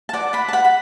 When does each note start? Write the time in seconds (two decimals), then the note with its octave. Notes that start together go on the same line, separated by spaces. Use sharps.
0.09 A5
0.13 D5 F#5
0.33 F#5 B5
0.48 A5
0.53 F#5 B5
0.65 B5